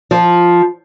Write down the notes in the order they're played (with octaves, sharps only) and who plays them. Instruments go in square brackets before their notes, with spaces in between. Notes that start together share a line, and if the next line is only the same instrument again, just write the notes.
[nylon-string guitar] F3